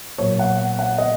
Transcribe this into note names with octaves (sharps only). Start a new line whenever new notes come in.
A#2 F#3 A#3 C#5
F#5
F#5
D#5